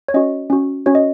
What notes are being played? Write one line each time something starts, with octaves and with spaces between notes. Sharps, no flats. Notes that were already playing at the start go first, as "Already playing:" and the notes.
C#5
C#4 F#4 D#5
C#4 F#4
C#4 F#4 C#5
D#5